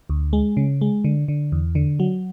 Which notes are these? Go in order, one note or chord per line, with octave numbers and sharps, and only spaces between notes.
D2
G#3
C#3
G#3
D3
D3
E2
D3
F#3